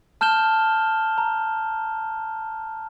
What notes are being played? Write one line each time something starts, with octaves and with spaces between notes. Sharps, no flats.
A5 F6 G6 E7 G7
A#5